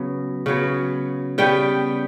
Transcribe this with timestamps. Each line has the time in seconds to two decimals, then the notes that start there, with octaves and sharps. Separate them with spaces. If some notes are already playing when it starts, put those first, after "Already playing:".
Already playing: C#3 F#3 B3
0.46 C#3 F#3 B3
1.38 C#3 G3 B3 G5